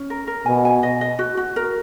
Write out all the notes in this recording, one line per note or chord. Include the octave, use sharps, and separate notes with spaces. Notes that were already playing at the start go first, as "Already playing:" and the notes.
Already playing: C#4
A#4
A#4
B2 G#5
G#5
D#5
D#5
F#4
F#4
A#4